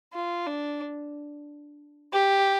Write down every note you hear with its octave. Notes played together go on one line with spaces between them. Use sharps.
F4
D4
G4